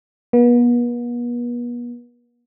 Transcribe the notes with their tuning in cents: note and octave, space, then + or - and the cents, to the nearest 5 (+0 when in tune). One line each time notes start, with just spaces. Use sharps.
B3 -40